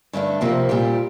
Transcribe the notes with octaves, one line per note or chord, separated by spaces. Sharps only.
G2 D3 A3 D4
F2 C3 F3 A#3
A#2 G3 C4 G4